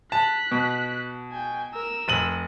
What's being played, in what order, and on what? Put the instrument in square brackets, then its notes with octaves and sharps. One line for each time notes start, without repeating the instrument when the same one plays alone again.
[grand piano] A5 [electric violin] F#6 B6
[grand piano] B2
[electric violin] G5 G#5
A#4 E6
[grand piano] F1 D#7 F#7